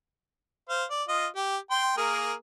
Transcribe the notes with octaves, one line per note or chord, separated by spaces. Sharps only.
C5 F5
D5
F4 D#5
G4
G5 C6
A#3 G#4 A#4